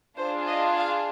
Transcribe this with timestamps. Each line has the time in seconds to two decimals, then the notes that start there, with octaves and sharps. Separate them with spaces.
0.17 D4 F4 G#4 C5
0.47 D#5
0.77 F5